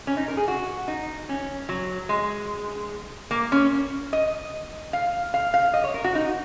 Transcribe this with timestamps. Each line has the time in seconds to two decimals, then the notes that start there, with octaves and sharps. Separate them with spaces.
0.07 C#4
0.17 D#4
0.28 A#4
0.37 G#4
0.48 F#4
0.88 D#4
1.29 C#4
1.69 F#3
2.09 G#3
3.31 A#3
3.52 C#4
4.13 D#5
4.93 F5
5.34 F5
5.54 F5
5.74 D#5
5.84 C#5
5.94 A#4
6.04 F#4
6.15 D#4